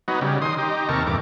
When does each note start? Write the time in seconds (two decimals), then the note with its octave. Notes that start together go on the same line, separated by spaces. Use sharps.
0.08 F#3 B3 D#4
0.21 C#3 G3
0.42 D#3 C6 D#6
0.58 D#4 G4
0.89 D#2 C3 A4 A#4 C#6
1.07 E2 G2 D6